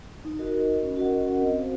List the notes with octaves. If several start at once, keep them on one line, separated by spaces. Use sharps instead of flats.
D#4
F#4 A#4 D#5
D#4
F#4 A#4 D#5
C#4
F#4 A#4 D#5 F#5
C#4
F#4 A#4 D#5 F#5
C4
F#4 C5 F5